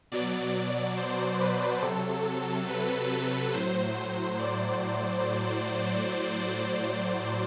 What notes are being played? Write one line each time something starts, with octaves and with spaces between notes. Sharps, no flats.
B2 F#3 D5
C5
B4
C3 F#3 A4
A4
B4
B4
A2 F#3 C5
D5